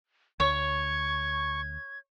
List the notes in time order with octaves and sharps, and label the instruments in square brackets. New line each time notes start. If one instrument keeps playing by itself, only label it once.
[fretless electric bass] D2 [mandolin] C#5 [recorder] C#6 [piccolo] G#6